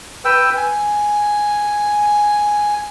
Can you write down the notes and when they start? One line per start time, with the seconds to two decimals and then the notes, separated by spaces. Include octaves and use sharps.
0.25 B4 G5 E6
0.57 G#5